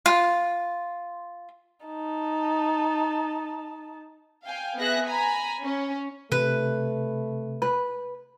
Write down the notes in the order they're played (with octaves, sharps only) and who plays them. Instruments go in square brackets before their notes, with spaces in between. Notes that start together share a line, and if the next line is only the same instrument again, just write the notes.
[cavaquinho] F4
[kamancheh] D#4 A5
[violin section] F5 G5 G#5
B3 G#4 E5 F#6 A#6
G#5 A#5 B5
C#4
[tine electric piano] C3 [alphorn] A3 [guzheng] B4
[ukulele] B4